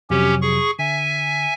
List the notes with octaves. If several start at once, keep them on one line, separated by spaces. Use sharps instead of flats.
F2 C3 F#3 C#4 G4
G#4 C#6
D3 E5 G#5